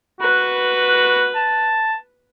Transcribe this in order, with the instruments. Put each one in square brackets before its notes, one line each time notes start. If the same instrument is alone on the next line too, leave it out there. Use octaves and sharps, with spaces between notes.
[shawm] F#4 [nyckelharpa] B4
[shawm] A5